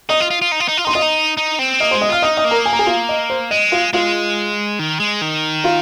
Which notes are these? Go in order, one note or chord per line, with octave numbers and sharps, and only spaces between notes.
D#4 D#5 D#6
F4
F4
F4
D#4
F4
D#4
F4
D#4 C6
F4 D#5 D#6
D#4
D#4
C4
A#3 D#5 D#6
C5 C6
G#3
D#5 D#6
F4 F5 F6
D#4 D#5 D#6
D#5 D#6
A#3
A#4 A#5
G#5
A#5
G#4 G#5
F4 F5
D#5
C5
G#3 D#5
F4 F5
G#3 F4 F5
D#3
G#3
D#3
F4 F5